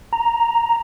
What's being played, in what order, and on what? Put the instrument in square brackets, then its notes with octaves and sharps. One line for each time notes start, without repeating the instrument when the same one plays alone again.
[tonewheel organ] A#5